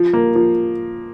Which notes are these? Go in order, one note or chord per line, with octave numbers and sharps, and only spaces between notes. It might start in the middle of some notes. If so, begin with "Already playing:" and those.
Already playing: F3
A#3
F3